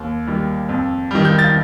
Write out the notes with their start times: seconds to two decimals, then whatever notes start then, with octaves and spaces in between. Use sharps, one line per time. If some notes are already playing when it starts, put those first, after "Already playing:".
Already playing: D#2
0.27 D#3 G3
0.69 F2
1.11 D#3 G3
1.25 G6
1.39 A6